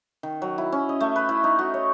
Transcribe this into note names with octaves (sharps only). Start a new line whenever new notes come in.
D#3
F#3
E4
C#4
D#5
A3
B4
E4
D#4
F#4
C#5